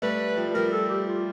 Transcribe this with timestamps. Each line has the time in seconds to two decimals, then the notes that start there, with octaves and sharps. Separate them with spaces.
0.02 G3 A3 B4
0.37 F3 G3
0.54 F3 G3 A#4
0.71 A4
0.89 G4
1.07 F4